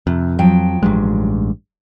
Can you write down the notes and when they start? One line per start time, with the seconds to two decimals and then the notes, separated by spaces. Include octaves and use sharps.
0.07 F2 C3
0.39 F3 F#3 G5
0.83 A1 G2 G#3